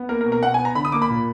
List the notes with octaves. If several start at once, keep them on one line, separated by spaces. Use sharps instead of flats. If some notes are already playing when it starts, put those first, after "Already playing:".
Already playing: B3
A#3 A#4
A#4
B2
A#4
B2 F#5
G#5
B3
A#5
D3 B5
D#6
A#3 D6
B5
A#2